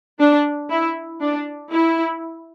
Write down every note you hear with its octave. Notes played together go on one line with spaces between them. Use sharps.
D4
E4
D4
E4